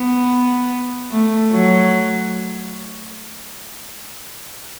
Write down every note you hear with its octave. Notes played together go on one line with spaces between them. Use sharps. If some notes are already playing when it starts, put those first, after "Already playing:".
Already playing: B3
A3
F#3